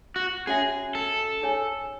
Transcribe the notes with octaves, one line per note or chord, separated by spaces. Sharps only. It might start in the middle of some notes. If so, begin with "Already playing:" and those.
F#4
C#4 F#4 G#4 C#5 E5 G#5
A4
D#4 G#4 C#5 G#5